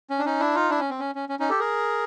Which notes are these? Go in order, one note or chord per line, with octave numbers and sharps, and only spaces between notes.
C#4
D4
C#4 D#4
D4 E4
D#4 F4
D4 E4
C#4
C4
C#4
C#4
C#4
C#4 D#4
G4 A4
G#4 A#4